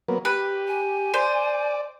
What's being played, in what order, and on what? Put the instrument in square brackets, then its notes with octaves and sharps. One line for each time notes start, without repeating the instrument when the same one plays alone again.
[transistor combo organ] F#3 A#3 B3
[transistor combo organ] G4 [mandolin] B4
[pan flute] G#5
[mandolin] C5 [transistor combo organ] D5